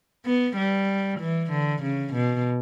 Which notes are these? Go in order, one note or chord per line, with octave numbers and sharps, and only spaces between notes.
B3
G3
E3
D3
C#3
B2